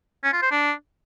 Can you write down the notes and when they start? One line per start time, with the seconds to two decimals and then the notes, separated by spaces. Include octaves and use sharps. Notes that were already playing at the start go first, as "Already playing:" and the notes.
0.24 C#4
0.33 F4
0.42 C5
0.51 D4